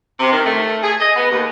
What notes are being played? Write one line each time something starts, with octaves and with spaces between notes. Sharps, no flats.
C3
D#3
A3
G#4
D#5
B3
D#2